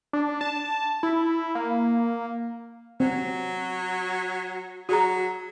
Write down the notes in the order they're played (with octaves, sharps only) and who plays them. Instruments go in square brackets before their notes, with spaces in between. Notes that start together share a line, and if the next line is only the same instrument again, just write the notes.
[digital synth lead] D4
A5
E4
A#3
[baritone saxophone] F#3 [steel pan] C4
[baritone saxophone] F#3 [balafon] F#4 G#4 A#5